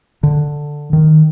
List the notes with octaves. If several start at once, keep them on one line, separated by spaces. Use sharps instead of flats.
D3
D#3